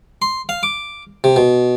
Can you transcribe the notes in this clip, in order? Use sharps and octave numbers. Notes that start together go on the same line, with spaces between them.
C6
F5
D6
C3
B2